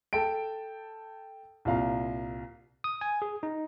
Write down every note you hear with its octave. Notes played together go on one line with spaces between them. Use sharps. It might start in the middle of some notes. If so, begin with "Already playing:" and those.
A4 G5 A5 D7
C2 A#2 F5 A#5
D#6
G#5
G#4
D#4